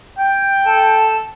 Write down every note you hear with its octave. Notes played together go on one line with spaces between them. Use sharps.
G5
A4